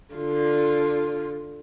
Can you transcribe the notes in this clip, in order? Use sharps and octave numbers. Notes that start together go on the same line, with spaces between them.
D3 F4